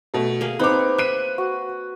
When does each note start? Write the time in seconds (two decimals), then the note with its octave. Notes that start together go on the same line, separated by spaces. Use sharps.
0.14 B2 A3
0.41 A#3 G#4
0.59 C4 D#4 B4 C#5 D6
0.98 E5 F#6 D#7
1.38 F#4